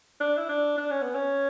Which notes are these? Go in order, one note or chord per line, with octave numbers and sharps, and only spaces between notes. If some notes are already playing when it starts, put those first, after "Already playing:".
D4
E4
D4
D4
C#4
B3
C#4